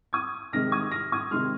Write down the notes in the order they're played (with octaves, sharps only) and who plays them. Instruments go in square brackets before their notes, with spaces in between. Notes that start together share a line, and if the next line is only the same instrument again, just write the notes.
[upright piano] D#6 G#6
C3 D#3 G#3 F6 A#6
D#6 G#6
F6 A#6
D#6 G#6
C3 D#3 G#3 C6 F6